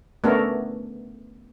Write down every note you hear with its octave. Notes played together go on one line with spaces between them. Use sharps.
A3 B3 C#4 D4 A4 A#4